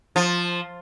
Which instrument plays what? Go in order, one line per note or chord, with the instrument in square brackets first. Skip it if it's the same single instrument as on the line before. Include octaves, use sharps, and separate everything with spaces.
[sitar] F3